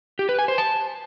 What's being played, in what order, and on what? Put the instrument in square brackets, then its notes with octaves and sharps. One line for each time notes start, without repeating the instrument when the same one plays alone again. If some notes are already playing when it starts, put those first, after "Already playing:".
[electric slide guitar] G4
B4
G#5
C5
A5